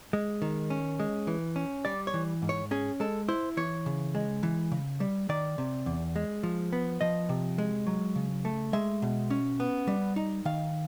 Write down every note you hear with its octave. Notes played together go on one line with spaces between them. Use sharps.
G#3
D#3
C#4
G#3
E3
C#4
G3 D5
C#5
E3
G#2
C#5
C#4 G#4
G#3 A4
E4 C5
E3 C#5
C#3
G#3
E3
C#3
G3
D#3 D5
C3
E2
G#3
F3
B3
F3 D#5
C3
G#3
F#3
C#3
A3
G#3 E5
B2
C#4
B3
G3
D#4
D#3 F5